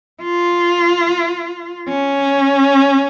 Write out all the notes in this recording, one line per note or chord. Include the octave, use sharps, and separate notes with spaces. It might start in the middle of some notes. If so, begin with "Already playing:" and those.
F4
C#4